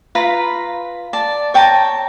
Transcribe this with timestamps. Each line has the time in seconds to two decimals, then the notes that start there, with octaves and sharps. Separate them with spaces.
0.15 F4 B4 A#5 B5
1.13 D5 A5
1.54 C#5 G5 A5 A#5